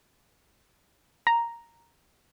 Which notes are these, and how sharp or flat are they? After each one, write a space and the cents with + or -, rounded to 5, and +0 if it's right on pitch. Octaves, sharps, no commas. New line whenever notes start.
A#5 +0